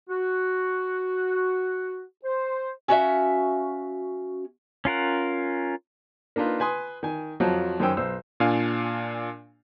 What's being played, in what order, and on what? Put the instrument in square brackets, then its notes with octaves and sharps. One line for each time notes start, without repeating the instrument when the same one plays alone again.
[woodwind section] F#4
C5
[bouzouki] C#4 F#4 E5 F5
[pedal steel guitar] C#4 F4 A#4 F#5
[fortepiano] A#3 D4 D#4 F4 B4
B4 G#5 C6 D#6
D#3 G#5
F2 F3 F#3 C5
F#2 D#3 C#4 C5 G5 E6
B1 C5 E6
[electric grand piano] A#2 D4 F5 G#5